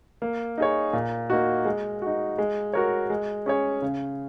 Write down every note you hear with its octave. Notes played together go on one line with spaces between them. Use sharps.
A#3
D#4 G#4 C#5
A#2
A#3 D#4 F#4
G#3
D#4 F#4
G#3
F#4 A#4 C#5
G#3
C#4 G#4 C#5
C#3